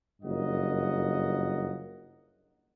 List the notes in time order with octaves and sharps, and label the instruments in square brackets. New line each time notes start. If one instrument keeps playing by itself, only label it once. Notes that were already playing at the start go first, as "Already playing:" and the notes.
[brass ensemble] F#1 G2 F4 A#4 D#5 F#5